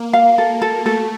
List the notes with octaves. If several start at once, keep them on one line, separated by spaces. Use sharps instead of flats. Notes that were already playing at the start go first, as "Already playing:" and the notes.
Already playing: A#3
F5
A4
A4
A3 A4